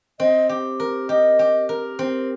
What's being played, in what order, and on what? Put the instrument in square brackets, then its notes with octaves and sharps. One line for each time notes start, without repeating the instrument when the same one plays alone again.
[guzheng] C4 [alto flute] D#5
[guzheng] G4
A#4
[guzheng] G4 [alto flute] D#5
[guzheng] G4
A#4
C4